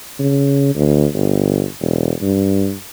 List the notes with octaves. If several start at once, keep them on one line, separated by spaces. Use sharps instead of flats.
C#3
D2
G1
E1
G2